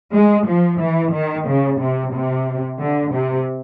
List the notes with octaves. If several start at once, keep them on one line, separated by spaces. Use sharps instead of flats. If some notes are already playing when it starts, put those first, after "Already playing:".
G#3
F3
E3
D#3
C#3
C3
C3
D3
C3